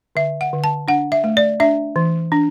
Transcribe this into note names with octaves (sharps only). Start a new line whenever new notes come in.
D3 E5
F#5
D3
A5
D4 F#5
E5
A3
D5
D4 E5
E3
D4